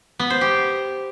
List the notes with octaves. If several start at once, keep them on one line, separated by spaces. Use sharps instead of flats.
B3
C5
G4